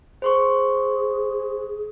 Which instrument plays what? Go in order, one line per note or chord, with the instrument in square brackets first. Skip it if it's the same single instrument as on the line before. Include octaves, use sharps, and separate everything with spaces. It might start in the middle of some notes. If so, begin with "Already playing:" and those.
[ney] G#4 [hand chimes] C5 C6 C#6